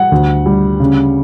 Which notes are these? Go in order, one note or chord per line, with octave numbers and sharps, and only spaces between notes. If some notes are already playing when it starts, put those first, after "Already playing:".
Already playing: G3 F#5
D2
G3
C#3